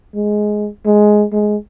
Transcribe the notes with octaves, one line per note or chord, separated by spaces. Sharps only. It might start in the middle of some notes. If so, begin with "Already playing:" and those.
G#3
G#3
G#3